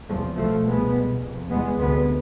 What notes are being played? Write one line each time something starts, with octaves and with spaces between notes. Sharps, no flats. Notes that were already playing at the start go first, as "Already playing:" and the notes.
E2 C3 F3 A3
C2 B2 F3 A3
C2 B2 G#3 B3
C2 B2
F2 C3
E2 C3 G#3 B3
D2 C3 G#3 B3